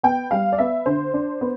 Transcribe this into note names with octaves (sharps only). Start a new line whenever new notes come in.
B3 G5
G3 F5
D5
B3 E5
D3 C5
D4
B3